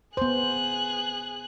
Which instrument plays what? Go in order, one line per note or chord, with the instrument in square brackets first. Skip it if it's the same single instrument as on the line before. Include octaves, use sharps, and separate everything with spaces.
[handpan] B3 C5 [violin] G#4 F#6